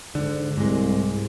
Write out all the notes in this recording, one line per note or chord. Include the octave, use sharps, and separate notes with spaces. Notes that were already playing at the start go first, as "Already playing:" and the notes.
G#2 D3
C2 G#2 G#3